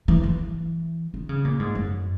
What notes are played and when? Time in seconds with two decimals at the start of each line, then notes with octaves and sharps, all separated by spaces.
0.08 E3
0.23 E3
1.14 D#3
1.29 C#3
1.45 A#2
1.60 G#2
1.75 F#2